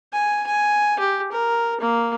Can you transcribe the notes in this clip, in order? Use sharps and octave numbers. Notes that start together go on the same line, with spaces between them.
G#5
G#5
G4
A#4
A#3